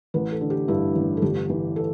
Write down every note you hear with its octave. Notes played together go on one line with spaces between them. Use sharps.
A1 B4
A4
D3
G4
G2 E4
A1
A4
G1 G4
E3
A4